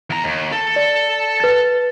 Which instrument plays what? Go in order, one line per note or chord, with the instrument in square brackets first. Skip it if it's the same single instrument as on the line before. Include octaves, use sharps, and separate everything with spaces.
[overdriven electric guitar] E2 A#5
D#2
A4
[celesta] D5
B4 A6